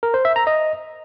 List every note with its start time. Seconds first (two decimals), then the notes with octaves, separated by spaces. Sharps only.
0.03 A#4
0.14 C5
0.25 E5
0.36 A#5
0.47 D#5